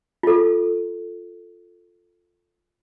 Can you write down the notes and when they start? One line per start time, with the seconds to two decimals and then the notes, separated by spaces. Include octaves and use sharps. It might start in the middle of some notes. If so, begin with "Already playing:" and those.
0.23 F4 A4